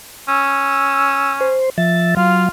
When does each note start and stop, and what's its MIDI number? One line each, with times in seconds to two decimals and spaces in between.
0.28 1.57 61
0.28 1.34 88
1.41 1.70 72
1.78 2.15 53
1.78 2.15 76
1.78 2.15 93
2.17 2.49 54
2.17 2.50 65
2.17 2.49 77